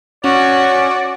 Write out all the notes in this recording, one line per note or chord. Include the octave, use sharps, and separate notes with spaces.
C#4 F#4 D5